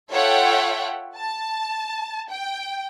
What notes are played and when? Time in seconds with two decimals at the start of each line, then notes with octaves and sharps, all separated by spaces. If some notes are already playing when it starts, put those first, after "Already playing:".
0.10 F4 A4 C#5 E5 F#5 G5
1.16 A5
2.30 G5